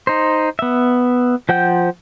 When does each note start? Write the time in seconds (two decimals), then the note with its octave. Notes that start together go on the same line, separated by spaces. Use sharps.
0.07 D#4 C5
0.59 B3 E5
1.49 F3 C5 F#5 G5 G6